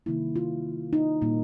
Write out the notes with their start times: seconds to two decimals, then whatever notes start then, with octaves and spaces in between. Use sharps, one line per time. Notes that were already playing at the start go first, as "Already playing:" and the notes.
0.06 C3 D#3 G3 A#3 E4
0.36 F4
0.93 D#4
1.21 A#2 G3 A#3